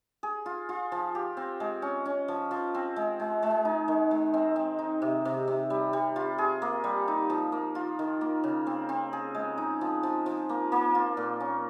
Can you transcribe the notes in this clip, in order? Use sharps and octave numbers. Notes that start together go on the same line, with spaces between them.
G#4
F4
F4
F3
G4
C4
G#3
C#4
C#4
F3
F3
C4
G#3
G#3
G#3
D#4
D#3
G#3
C4
C4
D#4
C3
C3
C3
G3
G3
F4
G#4
A#3
G3
D#4
F3
A#3
F4
D#3
A#3
C#3
C4
C4
G#4
G#3
D#4
F3
F3
F3
A#3
A#3
F4
A#2
C#4